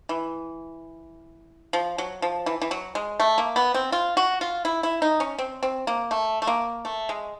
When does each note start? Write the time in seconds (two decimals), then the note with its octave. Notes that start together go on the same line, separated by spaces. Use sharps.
0.09 E3
1.73 F3
1.98 F#3
2.22 F3
2.46 E3
2.62 E3
2.71 F#3
2.95 G#3
3.20 A3
3.38 A#3
3.56 B3
3.74 C4
3.92 F4
4.17 F#4
4.41 F4
4.65 E4
4.83 E4
5.02 D#4
5.20 C#4
5.39 C4
5.63 C4
5.87 A#3
6.11 A3
6.42 A3
6.47 A#3
6.85 A3
7.09 G#3